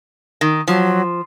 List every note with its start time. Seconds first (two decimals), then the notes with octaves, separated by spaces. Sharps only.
0.41 D#3
0.68 F3 F#3